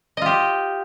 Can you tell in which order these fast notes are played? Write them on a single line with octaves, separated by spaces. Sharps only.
D#5 F4 G4